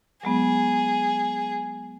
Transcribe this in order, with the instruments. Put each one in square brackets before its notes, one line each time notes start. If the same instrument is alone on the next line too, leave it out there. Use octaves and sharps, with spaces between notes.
[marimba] F#3 G#3 B3 [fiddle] G#4